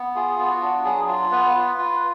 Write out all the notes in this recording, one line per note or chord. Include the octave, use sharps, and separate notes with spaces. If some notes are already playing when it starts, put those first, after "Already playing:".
Already playing: B3
F4 G#4
B3
F#4
D4
F#3 G#4
F4
B3 B4
F4
F4